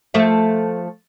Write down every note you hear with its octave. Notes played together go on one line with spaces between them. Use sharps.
F3 A3 E5